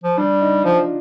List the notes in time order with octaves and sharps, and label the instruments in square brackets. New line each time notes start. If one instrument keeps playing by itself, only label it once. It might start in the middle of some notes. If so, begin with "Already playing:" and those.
[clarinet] F3
[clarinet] G3 [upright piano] D4
[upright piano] D#4
[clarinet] F3 [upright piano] F4